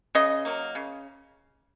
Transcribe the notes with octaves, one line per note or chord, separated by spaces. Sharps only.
C#3 D#5
F#3 A#3
C#3